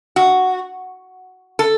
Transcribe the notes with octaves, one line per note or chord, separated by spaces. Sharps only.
F#4
A4